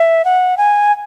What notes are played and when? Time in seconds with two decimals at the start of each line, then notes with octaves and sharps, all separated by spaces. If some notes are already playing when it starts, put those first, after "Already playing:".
Already playing: E5
0.25 F#5
0.58 G#5